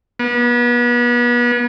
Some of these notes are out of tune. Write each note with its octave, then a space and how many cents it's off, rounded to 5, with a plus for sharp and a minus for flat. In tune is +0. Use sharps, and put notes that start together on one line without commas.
B3 -35